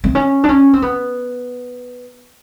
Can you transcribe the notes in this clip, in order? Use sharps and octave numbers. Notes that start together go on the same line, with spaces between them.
C4
C#4
D4
C#4
C4
B3